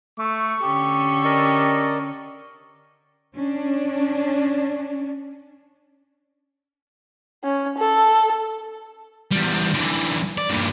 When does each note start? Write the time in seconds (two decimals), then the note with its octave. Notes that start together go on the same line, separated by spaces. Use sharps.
0.19 A3 C#6
0.62 D3 C#4 G4 A4
1.25 A#4 D5 D#5
3.34 C#4 D4
7.44 C#4
7.78 A4
9.32 E2 G3
9.74 D3 E3
10.38 D5
10.50 G2 A#2